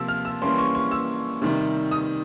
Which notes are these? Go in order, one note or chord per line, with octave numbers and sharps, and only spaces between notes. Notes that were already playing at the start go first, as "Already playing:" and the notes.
Already playing: C3 F3 A#3 E6
F6
E6
E3 G3 A#3 C#4 C6
C#6
C#6
E6
C3 D#3 G3
D#6